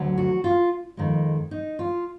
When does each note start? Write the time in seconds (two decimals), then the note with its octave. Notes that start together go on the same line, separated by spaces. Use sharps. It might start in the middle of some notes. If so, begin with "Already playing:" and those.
Already playing: D2 D3 F#3
0.18 F#4
0.44 F4
0.97 F2 D#3 G#3
1.51 D#4
1.79 F4